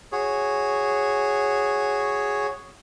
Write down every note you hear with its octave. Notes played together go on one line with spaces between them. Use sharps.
F#4 G#4 C#5